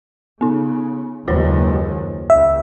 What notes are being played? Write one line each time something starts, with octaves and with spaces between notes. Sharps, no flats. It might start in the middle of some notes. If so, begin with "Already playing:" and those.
C#3 B3 D#4
F#1 D#2 G#3 F4 C5 C#5
C#2 E5